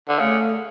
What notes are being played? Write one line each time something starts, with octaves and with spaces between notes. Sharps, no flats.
D3
C#3 A3